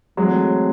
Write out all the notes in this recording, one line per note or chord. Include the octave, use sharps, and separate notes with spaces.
E3 F#3 G#3 A3 C4